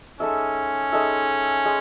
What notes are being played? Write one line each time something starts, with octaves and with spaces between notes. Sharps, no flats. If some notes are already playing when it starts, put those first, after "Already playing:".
G#3 C#4 D#4 A4 E5
G#3 D#4 A4 E5
G#3